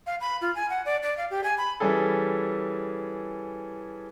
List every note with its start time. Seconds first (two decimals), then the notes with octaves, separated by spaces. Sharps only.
0.06 F5
0.21 B5
0.41 F4
0.55 G#5
0.70 F#5
0.85 D5
1.03 D5
1.17 F5
1.31 G4
1.44 G#5
1.58 B5
1.80 E3 G3 C#4 G#4 A4